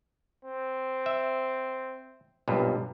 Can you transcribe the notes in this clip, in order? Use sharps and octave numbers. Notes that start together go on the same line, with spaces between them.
C4
E5
B1 G2 A#2